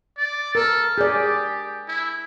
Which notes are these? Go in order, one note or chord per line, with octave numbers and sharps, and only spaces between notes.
D5
A4 A#4
G4 G#4 D5
E4